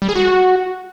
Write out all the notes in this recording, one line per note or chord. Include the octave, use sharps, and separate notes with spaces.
G3
G#4
F#4